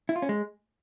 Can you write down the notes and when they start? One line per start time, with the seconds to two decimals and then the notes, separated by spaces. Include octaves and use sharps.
0.09 E4
0.16 F4
0.22 C#4
0.29 G#3